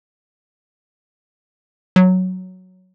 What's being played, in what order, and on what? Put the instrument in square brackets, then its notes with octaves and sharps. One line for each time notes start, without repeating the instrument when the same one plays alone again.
[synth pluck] F#3